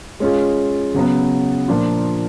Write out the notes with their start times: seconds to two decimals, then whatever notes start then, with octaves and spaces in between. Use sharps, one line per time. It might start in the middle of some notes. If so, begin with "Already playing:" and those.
0.20 G#3 C#4 F4 G#4
0.94 C#3 F#3 B3
1.68 A#2 F3 A#3 D4 F4